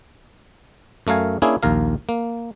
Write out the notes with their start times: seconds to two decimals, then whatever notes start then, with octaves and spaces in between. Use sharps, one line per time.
1.07 F#2 A3 A#4 F5 G#5
1.42 A#3 C#4 D4 E4 G#4
1.63 A#1 D#2 A#4 F5
2.09 A#3